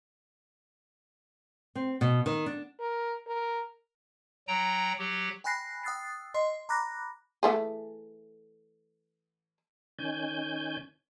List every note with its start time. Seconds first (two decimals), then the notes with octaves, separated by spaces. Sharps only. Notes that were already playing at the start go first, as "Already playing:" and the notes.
1.75 C4
2.01 B2
2.26 D#3
2.46 D4
2.80 A#4
3.27 A#4
4.48 F#3 G5 A#5
4.99 F#3 G4
5.44 G5 G#5 B5 F#6 A#6 C7
5.83 G5 D#6 E6 F#6 A6 C7
6.34 D#5 C6 C7
6.69 A#5 B5 D6 F#6 A#6
7.43 E3 A3 G#4
9.99 D#3 C#4 G#5 G6